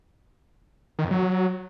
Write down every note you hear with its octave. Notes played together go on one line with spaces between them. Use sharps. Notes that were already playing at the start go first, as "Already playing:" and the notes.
D#3
F2
F#3